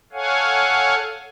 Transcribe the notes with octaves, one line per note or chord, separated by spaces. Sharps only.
A4 C#5 F5 F#5 G#5